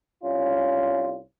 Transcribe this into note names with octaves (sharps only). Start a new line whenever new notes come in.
C2 C#4 F4